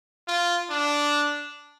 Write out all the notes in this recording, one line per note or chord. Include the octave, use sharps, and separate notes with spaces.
F4
D4